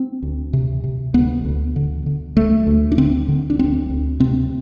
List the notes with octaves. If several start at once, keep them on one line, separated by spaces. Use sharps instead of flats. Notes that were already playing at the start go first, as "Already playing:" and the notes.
Already playing: C4
D2
C3
C3
D2 B3
D2
D3
D3
D2 A3
D2
D4
D3 C4
D3
D4
D2 C4
D2
C3 C4